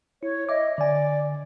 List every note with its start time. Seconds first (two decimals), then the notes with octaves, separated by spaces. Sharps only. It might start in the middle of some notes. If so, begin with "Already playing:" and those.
0.23 E4 C#5
0.49 D#5 E5 D6
0.78 D3 D5 G#5